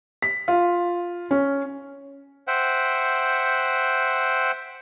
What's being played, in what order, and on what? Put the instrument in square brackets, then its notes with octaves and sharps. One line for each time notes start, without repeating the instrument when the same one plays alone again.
[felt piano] B6
F4
C#4
[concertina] C5 E5 F#5 G5